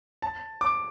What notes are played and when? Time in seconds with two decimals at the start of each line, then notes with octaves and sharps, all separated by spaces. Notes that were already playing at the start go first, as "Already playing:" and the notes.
0.22 A5
0.61 D6